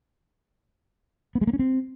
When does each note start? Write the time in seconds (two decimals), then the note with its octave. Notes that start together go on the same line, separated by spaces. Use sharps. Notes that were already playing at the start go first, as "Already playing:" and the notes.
1.35 B3
1.41 G#3
1.47 A#3
1.53 C#4
1.59 C4